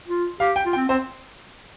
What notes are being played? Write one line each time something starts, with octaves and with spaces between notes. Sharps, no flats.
F4
G4 F5
G5
F4
G5
C4
C4 C5